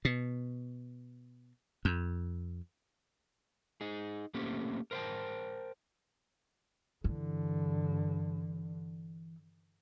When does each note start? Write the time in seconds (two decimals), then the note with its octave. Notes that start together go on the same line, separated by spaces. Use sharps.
0.05 B2
1.85 F2
3.81 D#4 G#4
4.34 A3 A#3 C4 C#4 G4
4.91 A#4 C5 F5 G5 A5
7.04 G2 D3 E3